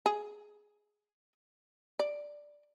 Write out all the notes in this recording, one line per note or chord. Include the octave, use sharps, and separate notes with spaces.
G#4
D5